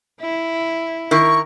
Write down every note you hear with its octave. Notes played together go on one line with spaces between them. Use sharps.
E4
D#3 E4 A#4 C#6